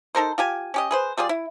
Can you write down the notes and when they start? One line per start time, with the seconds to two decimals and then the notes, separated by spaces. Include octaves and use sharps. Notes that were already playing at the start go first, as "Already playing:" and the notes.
0.15 D#4 A4 A#4 C5
0.38 F4 G4 G#5
0.74 C#4 G4 D#5
0.91 G#4 B4 C5
1.18 G3 F4 G#4 D5
1.29 E4